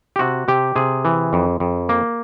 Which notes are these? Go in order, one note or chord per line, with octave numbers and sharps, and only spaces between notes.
G4
C3 F#4
C3 G4
C3 G#4
E3
F2
F2
A#3